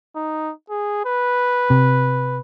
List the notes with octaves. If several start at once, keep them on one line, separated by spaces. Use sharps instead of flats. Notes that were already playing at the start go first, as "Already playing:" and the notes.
D#4
G#4
B4
C3